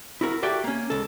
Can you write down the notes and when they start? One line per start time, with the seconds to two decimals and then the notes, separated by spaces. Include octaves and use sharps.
0.21 E4 F#4 A4 A#4
0.43 F#4 G4 A4 D5 E5 G5
0.64 A#3 C#4
0.90 C#2 A4